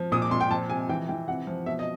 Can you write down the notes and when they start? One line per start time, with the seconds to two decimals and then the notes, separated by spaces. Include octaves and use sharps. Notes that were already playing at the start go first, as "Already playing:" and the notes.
Already playing: F3
0.12 A#2 D#6
0.22 D6
0.31 A#2 C6
0.41 G5
0.51 F3 A5
0.70 C3 G#5
0.89 E3 G5
1.08 E3 G5
1.28 C3 F#5
1.47 F3
1.66 B2 E5
1.79 D#5